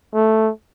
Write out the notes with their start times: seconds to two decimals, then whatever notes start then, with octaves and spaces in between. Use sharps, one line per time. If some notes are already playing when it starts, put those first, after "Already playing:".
0.14 A3